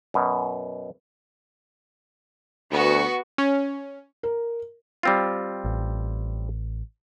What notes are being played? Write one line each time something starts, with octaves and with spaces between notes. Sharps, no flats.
F#2 B2
D2 B3 F#4
C#4
A#4
G3 C4 F4
A1